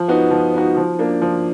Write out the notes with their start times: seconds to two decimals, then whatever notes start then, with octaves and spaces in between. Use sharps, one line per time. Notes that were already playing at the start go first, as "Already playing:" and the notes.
Already playing: F3
0.08 B3 D#4 F#4
0.31 F3
0.54 B3 D#4 F#4
0.77 F3
0.99 A#3 D4
1.22 F3